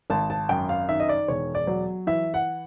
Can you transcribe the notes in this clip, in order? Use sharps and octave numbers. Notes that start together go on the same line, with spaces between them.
G#1 A5
A5
F#2 G5
F5
D#3 E5
D#5
D5
E1 C#5
D5
F#3
E3 E5
F#5